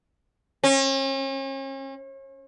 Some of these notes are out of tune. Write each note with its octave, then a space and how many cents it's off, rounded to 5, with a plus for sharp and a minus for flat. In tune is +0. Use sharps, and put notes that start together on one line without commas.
C#4 -40